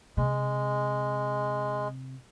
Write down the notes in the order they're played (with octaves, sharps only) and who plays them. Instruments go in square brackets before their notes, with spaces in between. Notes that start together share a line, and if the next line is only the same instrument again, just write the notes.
[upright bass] C3 [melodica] G#3